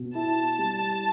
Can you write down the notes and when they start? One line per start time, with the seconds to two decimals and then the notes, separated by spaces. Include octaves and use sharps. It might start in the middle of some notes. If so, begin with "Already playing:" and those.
Already playing: B2
0.15 E4 A5
0.58 G3